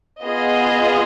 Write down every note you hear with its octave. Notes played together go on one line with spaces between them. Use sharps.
B3 F4 G#4 D#5